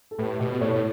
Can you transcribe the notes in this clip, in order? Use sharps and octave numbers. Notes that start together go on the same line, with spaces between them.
A4
A2 G4 B4
B2 G4 B4
A2 A4 C#5
A2